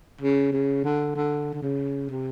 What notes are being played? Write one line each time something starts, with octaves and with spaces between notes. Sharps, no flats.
C#3
C#3
D3
D3
D3
C#3
C3